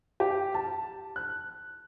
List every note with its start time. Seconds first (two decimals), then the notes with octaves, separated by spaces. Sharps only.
0.20 G4
0.54 A5
1.16 F#6